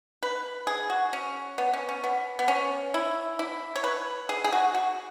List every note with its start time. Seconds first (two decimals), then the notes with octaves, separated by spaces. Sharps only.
0.23 B4
0.67 G#4
0.90 F#4
1.13 C#4
1.58 B3
1.74 C#4
1.89 C#4
2.04 B3
2.39 B3
2.48 C#4
2.94 E4
3.39 E4
3.76 C#5
3.84 B4
4.29 G#4
4.44 G#4
4.53 F#4
4.75 F#4